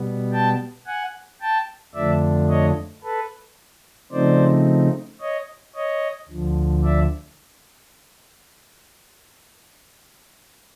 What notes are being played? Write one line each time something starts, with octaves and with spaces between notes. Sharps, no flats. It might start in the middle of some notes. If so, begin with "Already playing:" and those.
Already playing: B2 G3 B3
G5 A5
F#5 G#5
G5 A5
F2 D3 F3 A3 D4 D5 E5
C#5 D#5
A4 B4
C#3 F3 A3 C4 D#4 C5 D5
C#5 D#5
C#5 D#5
D2 D3 F3
D5 E5